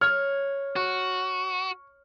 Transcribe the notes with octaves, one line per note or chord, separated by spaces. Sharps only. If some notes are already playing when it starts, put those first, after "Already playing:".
C#5 F6
F#4 C#6